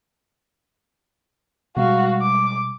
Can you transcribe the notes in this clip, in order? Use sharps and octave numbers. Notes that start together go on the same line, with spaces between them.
B2 G3 G#3 F#4 F5
D6